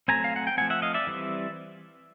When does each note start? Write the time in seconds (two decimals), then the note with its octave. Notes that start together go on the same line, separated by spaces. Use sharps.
0.08 F#3 A3 C4 G#5 A#5
0.24 F5
0.36 F#5
0.47 G5
0.57 F3 A3 C4 F#5 G#5
0.70 E5 F#5
0.82 D#5 F5
0.94 D5 E5
1.07 E3 G3 C4